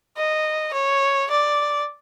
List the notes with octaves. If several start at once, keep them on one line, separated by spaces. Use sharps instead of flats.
D#5
C#5
D5